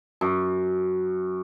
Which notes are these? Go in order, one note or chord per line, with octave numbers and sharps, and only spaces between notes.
F#2